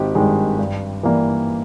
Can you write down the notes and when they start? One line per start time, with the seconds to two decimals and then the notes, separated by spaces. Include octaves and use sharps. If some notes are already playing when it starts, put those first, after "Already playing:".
Already playing: G#1 G4
0.15 G2 D#3 G#3
0.59 G2
1.03 E3 G3 A#3